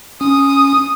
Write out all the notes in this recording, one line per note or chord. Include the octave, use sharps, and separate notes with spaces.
C#4 D#6